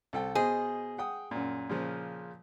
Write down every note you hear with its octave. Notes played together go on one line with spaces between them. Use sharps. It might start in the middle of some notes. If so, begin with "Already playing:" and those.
C2 A4 G5
B2 G#4 C5 D#5
F#5 G5 D#6
F#2 A#2
A#2 C#3 F3